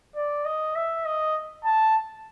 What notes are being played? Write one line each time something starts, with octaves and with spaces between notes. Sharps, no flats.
D5
D#5
E5
D#5
A5